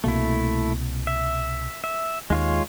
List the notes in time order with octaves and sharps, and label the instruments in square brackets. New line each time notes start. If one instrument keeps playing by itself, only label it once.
[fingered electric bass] C2 B2 A#3 [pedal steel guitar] A3 E4
[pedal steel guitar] E5
E5
[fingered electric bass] D#2 [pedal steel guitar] G#3 F4 C#5